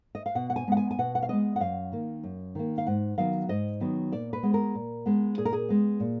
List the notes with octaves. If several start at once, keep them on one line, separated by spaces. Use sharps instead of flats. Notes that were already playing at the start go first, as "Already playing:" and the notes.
D#5
F5
B2 F#5
F#5
G#5
G#3 B3 F#5
G#5
G#5
B2 F#5
F#5
F5
G#3 B3 D#5
F#5
F#2 F5
D#3 A#3
F#2
D#3 A#3
F5
G#2 F#5
D#3 F#3 B3 F5
G#2 D#5
D#3 F#3 B3
A#2 D5
B4
G#3 B3
A#4
A#2
G#3 B3
A#2 G#4
A#4
G#4
G#3 B3
A#2